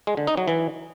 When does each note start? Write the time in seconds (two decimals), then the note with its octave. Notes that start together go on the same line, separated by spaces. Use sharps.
0.07 G#3
0.17 D3
0.27 D#4
0.37 F#3
0.48 E3